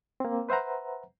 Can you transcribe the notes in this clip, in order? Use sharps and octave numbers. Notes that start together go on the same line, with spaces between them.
A#3 C4
B4 C5 E5 F#5 A#5